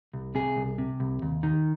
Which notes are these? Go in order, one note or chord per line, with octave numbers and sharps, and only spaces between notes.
C2
C3 G#4
C2
C3
C2
D#2
D#3